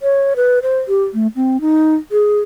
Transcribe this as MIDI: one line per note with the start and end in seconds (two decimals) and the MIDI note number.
0.02 0.34 73
0.36 0.59 71
0.63 0.78 72
0.88 1.04 67
1.14 1.27 57
1.36 1.60 60
1.61 1.95 63
2.12 2.40 68